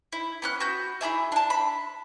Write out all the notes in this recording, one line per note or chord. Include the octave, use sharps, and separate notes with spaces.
E4
B3 C#4 F#6
F#4 B4 G6
E4 G4 G#4 E5
D4 A5
B5